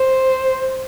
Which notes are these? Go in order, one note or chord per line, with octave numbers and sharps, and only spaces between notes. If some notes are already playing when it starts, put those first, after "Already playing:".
Already playing: C5